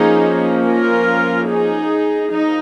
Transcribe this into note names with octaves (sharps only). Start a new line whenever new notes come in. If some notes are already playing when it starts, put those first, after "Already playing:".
Already playing: F3 A#3 C#4 D#4 G#4
F4 A#4
D#4 G#4
F3 A#3 D#4